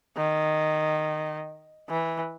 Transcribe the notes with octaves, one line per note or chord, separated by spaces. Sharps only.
D#3
E3